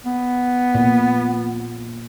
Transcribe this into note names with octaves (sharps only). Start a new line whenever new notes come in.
B3
A#2